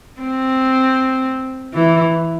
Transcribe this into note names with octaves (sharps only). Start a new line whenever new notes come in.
C4
E3